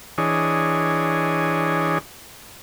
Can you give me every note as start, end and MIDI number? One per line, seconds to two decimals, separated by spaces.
0.18 1.98 52
0.18 1.98 62
0.18 1.98 68
0.18 1.98 73
0.18 1.98 75